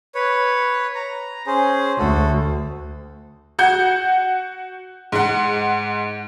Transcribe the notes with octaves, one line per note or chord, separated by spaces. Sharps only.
B4 C#5
A#5
C#4 G#4 C5
D2 F#4 A4
F#4 F#5 G6
G#2 F#5